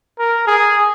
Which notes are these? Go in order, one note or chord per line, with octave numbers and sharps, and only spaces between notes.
A#4
G#4